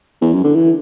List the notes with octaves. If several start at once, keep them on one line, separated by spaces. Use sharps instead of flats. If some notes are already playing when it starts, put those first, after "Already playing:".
E2
F#2
D3
E3